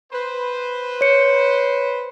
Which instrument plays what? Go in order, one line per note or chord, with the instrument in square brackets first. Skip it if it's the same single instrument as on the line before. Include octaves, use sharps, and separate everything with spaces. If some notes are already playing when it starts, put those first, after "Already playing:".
[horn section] B4 C5
[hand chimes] C#5 C#7